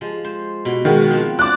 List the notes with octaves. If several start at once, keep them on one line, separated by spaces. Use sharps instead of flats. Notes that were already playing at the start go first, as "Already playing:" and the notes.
F3 G#3
C5
B2
D#3 G#3 F#4 B4
F3 C4
D5 G5 A5 D6 F#6